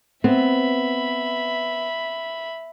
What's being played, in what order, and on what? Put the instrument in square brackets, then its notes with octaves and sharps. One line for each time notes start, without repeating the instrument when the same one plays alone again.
[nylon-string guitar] B3 [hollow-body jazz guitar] C4 [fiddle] E5 B5